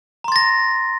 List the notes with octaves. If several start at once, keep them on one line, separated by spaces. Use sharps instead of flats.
A#5 C6 A6 A#6